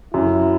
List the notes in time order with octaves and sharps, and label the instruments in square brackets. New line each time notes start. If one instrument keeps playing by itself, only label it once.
[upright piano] F#2 [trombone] E4